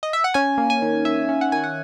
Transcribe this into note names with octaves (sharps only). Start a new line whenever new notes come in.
D#5
E5
F#5
C#4 G#5
A#3
G#5
D#3
D#3 E5
C#4
F#5
D#3 G#5
F#5